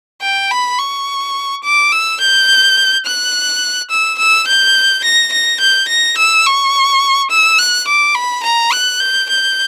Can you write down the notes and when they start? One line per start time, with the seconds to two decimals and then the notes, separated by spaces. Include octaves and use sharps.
0.22 G5
0.51 B5
0.79 C#6
1.64 D6
1.92 E6
2.21 G6
3.06 F#6
3.90 E6
4.19 E6
4.48 G6
5.04 A#6
5.33 A#6
5.60 G6
5.88 A#6
6.18 E6
6.46 C#6
7.31 E6
7.58 F#6
7.88 D6
8.15 B5
8.44 A#5
8.72 F#6
9.00 G6
9.29 G6